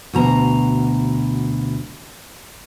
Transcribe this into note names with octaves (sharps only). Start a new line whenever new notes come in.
D2 B2 A#5